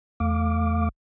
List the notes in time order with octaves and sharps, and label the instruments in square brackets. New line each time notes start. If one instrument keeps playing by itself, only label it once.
[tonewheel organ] E2 A3 F5 D6